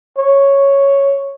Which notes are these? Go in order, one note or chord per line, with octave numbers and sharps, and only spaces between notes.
C#5